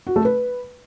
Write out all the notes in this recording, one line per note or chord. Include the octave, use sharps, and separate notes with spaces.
F#4
A3
B4